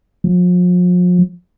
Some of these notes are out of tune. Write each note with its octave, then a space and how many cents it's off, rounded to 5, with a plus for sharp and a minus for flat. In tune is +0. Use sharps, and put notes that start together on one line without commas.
F3 +40